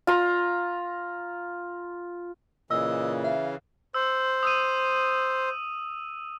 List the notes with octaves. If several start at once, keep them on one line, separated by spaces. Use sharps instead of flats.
F4 A#5
A#2 C#3 E3 D#5 E6
E5 F5
C5 E6
D#6 E6 D#7